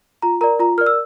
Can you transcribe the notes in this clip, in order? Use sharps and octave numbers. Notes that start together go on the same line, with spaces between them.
F4 A#5
A#4 D5 A#5
F4 A#5
A#4 D5 F6
E6